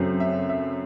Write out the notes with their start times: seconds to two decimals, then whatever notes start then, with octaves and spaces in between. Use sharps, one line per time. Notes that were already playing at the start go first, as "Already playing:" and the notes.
Already playing: F#2 C#3 F#3 A3 C4
0.20 E5
0.49 E5